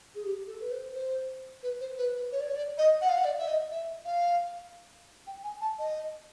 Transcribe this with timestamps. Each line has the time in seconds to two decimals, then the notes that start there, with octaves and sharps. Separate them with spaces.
0.15 G#4
0.25 G4
0.47 A4
0.61 B4
0.71 C5
0.94 C5
1.63 B4
1.81 C5
1.98 B4
2.15 B4
2.32 C#5
2.40 D5
2.48 C#5
2.55 D5
2.78 D#5
3.01 F#5
3.09 F5
3.18 F#5
3.24 D5
3.39 E5
3.48 D#5
3.71 E5
4.05 F5
5.27 G5
5.44 G#5
5.61 A5
5.79 D#5